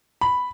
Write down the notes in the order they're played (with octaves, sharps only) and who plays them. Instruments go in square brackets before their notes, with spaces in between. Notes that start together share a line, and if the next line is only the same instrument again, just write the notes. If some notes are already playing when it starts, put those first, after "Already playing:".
[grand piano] B5